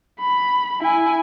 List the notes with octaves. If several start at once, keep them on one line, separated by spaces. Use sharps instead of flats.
B5
E4 G#5